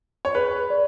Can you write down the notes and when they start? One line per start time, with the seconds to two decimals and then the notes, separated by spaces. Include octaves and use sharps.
0.25 C#5
0.35 G#4 B4
0.70 D5